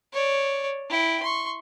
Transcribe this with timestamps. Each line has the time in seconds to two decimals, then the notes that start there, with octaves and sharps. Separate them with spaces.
0.13 C#5 D5
0.90 E4 G5
1.22 C6 C#6